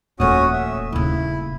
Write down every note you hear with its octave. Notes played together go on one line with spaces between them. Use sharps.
D#1 F2 A#2 A3 C#4 F#4 D#6
E5
D#1 C#3 E4